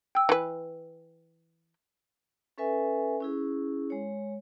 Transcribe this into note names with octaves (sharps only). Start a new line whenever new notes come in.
G5 E6
E3 B4
C#4 A4 B4 E5 G#5
C#4 E4 G#4
G#3 C#5